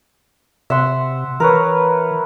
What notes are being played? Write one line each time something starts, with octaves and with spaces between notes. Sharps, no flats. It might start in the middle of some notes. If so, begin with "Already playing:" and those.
C3 E5 F#5 C6
E3 A#4 B4 C#5